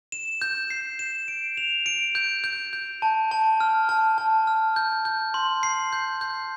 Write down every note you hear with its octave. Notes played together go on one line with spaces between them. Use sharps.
E7
G6
C7
E7
D7
F7
D7
G6
G6
G6
A5
A5
F6
A5
A5
F6
G6
G6
C6
C7
G6
G6